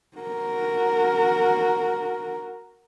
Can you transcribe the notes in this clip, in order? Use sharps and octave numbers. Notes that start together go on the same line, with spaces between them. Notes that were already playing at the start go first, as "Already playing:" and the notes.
F#4 A#4